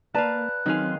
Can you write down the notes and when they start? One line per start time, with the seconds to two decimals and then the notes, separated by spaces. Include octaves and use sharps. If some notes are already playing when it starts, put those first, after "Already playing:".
0.15 A#3 B4 D5 F5 A5 A#5 F#6
0.66 D#3 F#3 C4 C#4 G#4 F5 G#5 C6